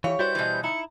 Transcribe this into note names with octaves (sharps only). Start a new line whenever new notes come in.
E3 E4 G4 C#5 F5
G3 E4 F#4 B4 C5 G6
B2 E3
D#4 E4 A#5 C#7